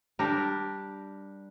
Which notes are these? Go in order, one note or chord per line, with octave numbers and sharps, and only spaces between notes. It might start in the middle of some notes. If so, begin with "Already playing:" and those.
G3 D4 G4 A#4